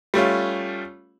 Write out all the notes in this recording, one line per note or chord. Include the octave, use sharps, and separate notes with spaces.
G3 A3 C#4 F4